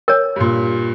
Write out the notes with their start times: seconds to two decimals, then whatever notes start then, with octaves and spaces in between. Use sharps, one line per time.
0.08 A#4 C#5
0.36 G2 A#2